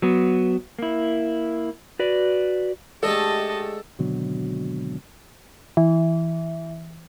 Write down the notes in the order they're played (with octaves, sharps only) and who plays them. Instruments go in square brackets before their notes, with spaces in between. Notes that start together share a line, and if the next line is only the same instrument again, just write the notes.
[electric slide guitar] F#3 B3
A#3 E4
F#4 B4 D5
[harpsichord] G#2 A3 D4 [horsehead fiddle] G4 [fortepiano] A4 [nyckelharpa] D#5 A5
[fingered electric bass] G#1 B2 D3 F#3
[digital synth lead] E3